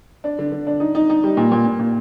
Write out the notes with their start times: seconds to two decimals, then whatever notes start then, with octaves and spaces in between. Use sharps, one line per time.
0.24 D4
0.39 D3
0.52 D3
0.67 D4
0.80 D#4
0.95 D#4
1.10 D#4
1.24 G3
1.37 A#2
1.52 A#2
1.66 A#2
1.79 A#2